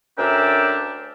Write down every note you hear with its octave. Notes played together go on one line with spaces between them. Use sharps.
D2 C#4 D4 A#4 E5 G5